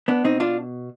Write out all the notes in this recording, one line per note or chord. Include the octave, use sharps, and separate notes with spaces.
B3 D4
B2 C4 D#4
D4 F4